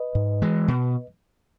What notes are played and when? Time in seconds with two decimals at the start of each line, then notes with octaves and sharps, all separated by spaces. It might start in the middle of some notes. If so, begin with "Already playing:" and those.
Already playing: B4 D#5
0.15 G#2
0.42 E3 G#3
0.68 B2